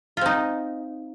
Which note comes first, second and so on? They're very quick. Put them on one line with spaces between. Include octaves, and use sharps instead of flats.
F4 C4 D#4